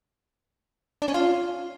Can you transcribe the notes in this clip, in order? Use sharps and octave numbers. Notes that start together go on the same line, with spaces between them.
D4
C#4
F4